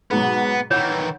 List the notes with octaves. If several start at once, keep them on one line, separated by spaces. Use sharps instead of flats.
G#2 B2 F#3 B3
D#3 E3 C#5 F#5 G6 E7